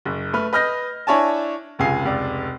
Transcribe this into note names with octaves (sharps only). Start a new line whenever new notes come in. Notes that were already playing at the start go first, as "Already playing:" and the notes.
F#1
A3 B4 F6
B4 D#5 F6 G6 A#6
D4 E4 C#5 G#5 A5
F1 C#2 C#3 F4 G#5 C7
F1 C#2 D5